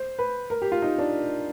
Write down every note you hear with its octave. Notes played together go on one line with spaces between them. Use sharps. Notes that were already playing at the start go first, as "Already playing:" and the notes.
Already playing: C5
B4
A#4
G4
F4
D#4
D4